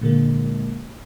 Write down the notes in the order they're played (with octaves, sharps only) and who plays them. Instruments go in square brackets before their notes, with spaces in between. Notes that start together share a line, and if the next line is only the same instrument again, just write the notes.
[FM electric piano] A#2 D3 G#3 A#3